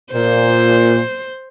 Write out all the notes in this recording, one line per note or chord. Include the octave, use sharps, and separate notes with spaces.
A#2 C5